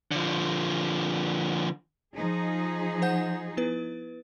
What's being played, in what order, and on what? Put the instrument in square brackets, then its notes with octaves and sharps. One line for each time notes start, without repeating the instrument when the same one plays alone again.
[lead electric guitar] D3 F3
[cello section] F3 D#4 G#4
[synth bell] C5 F#5 G6
B3 E4 B4